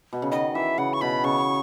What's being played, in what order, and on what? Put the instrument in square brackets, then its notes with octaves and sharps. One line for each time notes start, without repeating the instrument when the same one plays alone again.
[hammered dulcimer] B2
C#3
[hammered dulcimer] D#3 [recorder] D#5
[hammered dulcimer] E3 [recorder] E5
[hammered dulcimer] C#3 [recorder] F#5
[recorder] C#6
[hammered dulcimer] B2 [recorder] B5
[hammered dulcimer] C#3 [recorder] C#6